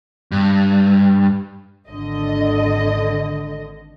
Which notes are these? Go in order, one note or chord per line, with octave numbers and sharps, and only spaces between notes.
G2
G#1 D3 D#5